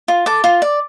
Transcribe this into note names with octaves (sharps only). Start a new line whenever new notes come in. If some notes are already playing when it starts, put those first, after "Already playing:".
F4
A4 D6
F4
D5